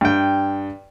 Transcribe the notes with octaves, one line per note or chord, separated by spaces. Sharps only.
G2 G5